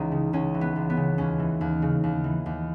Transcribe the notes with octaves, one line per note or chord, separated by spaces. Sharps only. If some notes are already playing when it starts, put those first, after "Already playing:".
Already playing: C#2 E3 C#4 D#4
C#3
C#2 C#4
E3
B3
C#2
B3
C#3
D#2 C#4
E3
D#2
C#3
D#2
E3
D#2